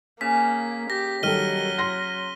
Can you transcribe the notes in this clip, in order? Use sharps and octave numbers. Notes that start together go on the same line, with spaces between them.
C#3 A#3 B6
G4 A#6
D#3 F#3 G3 A4 F6 D#7 G7
C6 A#6